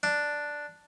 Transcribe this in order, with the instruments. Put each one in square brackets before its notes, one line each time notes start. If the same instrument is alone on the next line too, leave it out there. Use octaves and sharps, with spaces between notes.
[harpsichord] D4